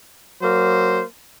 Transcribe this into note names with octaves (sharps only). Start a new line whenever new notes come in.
F#3 A#3 C5